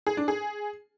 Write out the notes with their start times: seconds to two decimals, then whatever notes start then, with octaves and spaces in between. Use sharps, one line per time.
0.07 G#4
0.17 D4
0.28 G#4